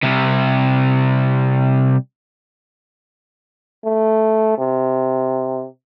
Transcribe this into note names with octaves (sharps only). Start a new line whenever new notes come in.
C3 G3
A3
C3